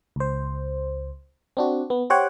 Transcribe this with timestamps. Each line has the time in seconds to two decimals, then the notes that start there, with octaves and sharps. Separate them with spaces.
0.16 C#2 C5
1.57 C4 D4 F#4
1.90 B3
2.10 G4 C5 C#5 F#5 G5